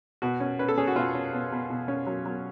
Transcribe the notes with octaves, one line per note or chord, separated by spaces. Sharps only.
B2 F#4
C#4
C#4 B4
A4
C#4 G#4
F#4
B2 F4
C#4
B2
B2
B2
C#4
F#3
F#3